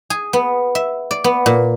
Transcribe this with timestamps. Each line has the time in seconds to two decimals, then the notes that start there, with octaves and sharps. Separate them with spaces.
0.10 G#4
0.33 B3
0.75 E5
1.11 D5
1.24 B3
1.46 A#2